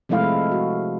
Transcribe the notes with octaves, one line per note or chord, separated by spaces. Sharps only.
C3 F3 G#3 A3 E4 F5
F#4